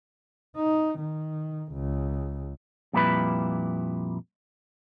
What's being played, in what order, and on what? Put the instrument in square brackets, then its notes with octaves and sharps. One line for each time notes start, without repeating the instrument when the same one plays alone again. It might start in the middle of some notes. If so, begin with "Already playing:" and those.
[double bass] D#4
D#3
C#2
[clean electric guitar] F2 A#2 G3 E4 B4 B5